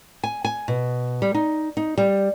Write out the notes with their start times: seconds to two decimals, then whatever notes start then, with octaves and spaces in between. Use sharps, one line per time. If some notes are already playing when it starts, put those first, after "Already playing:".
0.23 G#5
0.44 G#5
0.68 B2
1.22 G3
1.34 D#4
1.77 D#4
1.98 G3